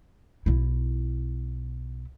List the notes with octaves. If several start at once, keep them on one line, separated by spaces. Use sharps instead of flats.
B1 E4